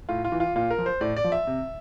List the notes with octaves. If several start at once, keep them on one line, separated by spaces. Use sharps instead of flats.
A2 F4
F4
E3
F4
A#2 F4
A#4
F3
C5
A2 D5
D5
F3
E5
C3